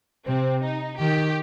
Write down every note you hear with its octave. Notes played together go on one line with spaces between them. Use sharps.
C3 C4
D#4
D#3 G4